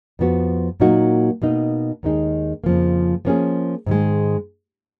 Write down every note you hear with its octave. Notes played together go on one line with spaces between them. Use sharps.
F2 F3 B3 F#4
A#2 F#3 A#3 D#4 F#4
B2 A#3 D#4
D#2 D#3 G#3 D#4 G#4
F2 C#3 F3 A#3
F3 A#3 C#4 G#4
G#2 D#3 G#3